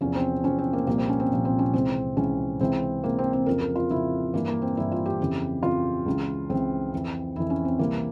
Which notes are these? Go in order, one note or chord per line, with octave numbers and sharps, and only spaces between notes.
E2 C3 F3 C#4
C4
E2 C3 F3 C#4
C4
A#3
C2 A#2 F3 A#3
C4
C#4
C4
C2 A#2 F3
C4
C#4
C#2 C3 E3 C4
C#2 C3 E3 C#4
C#2 C3 E3 C4
C#2 C3 E3 A#3
C4
C4
F2 C#3 F3 A#4
A#4
F4
F2 C#3 F3 E4
G2 E3 A#3
A#3
C4
G2 E3 E4
F4
G4
F2 C#3 E3
F2 C#3 E3 F4
C#2 C#3 E3
C#2 C#3 E3 C4
F2 E3
F2 E3 E4
C#4
C4
C2 C3 E3 A#3